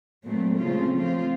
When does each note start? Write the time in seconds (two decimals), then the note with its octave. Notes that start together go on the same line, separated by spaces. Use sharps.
0.24 A#2 F#3 A3 C4
0.59 C#3 A3 C4 F4
0.93 F3 C4 F4